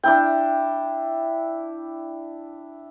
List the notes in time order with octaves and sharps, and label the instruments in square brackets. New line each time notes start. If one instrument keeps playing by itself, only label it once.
[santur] D4 E4 G5